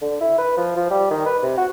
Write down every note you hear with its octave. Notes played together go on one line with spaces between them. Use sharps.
D3
E4
B4
F3
F3
G3
D#3
B4
C3
F#4